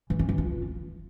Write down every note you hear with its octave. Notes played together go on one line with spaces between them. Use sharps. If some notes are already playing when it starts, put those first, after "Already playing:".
E3
C#4
E3
F4